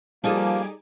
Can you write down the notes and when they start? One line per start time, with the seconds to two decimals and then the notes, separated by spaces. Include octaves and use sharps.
0.24 F3 G3 A#3 D#4 G#4 A4 G#5 D6